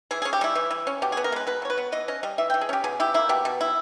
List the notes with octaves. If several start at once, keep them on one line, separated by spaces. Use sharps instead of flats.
E3 G#4
C#4 G#4
G4
G3 E4
E3
E3
C#4
B2 G4
B3 G#4
A#4
G#3 B4
B2 B4
B2 C#5
B4
B3
E3 D#5
C#4 D#5
G3 D#5
E3 E5
E3 G5
G#4
C#4 G4
B2 G#4
E4 G4
A#3 E4
B2 G4
B2
E4